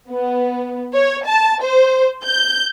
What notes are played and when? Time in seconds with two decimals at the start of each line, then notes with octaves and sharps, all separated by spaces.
0.11 B3
0.94 C#5
1.26 A5
1.62 C5
2.23 G6